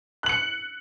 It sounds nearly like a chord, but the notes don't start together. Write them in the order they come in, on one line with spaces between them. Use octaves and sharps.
F#6 F#7 C#7